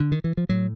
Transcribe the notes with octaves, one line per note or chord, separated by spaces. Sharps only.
D3
D#3
E3
F3
A2 F#3